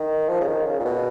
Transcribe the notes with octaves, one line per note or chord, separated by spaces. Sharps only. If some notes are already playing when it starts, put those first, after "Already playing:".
Already playing: D#3
F3
C#3
D#3
C#3
A#2
B2